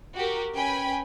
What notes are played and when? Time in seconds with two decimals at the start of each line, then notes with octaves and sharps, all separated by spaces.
0.15 F#4 G4 A#4
0.55 C#4 B4 G5 G#5 B5